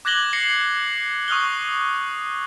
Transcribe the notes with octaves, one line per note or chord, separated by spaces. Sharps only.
D6 F#6 G#6 A#6 F#7 G7
A#6 C7 C#7
C#6 D#6 F6 F#6 G7